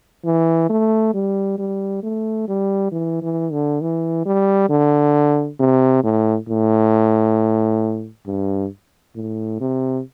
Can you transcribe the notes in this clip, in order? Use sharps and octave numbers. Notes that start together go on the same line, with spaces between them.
E3
A3
G3
G3
A3
G3
E3
E3
D3
E3
G3
D3
C3
A2
A2
G2
A2
C3